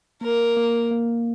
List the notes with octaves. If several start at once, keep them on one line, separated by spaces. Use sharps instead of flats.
A#3 A#4
A#3
A#3